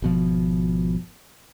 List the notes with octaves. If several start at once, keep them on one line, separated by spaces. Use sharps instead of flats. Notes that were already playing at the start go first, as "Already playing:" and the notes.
G#1 B2 F3